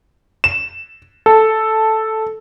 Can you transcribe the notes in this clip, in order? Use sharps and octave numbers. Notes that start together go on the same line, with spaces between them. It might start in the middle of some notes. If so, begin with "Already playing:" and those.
E7
A4